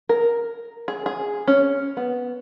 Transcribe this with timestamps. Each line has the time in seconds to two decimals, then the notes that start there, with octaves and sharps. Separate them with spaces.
0.09 A#4
0.88 G#4
1.06 G#4
1.48 C#4
1.97 B3